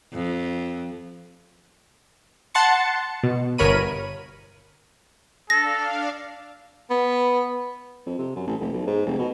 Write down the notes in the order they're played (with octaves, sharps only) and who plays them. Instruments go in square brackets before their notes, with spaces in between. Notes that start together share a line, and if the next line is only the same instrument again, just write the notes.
[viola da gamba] F2
[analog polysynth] F#5 A5 C6 A6 C#7
B2
G1 A#4 C#5 B5 D#7
[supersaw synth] D4 F5 [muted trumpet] A4 [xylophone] A#6
[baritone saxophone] B3
[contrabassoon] F2
C3
F#2
A1
F1
B1
G#2
F1
B2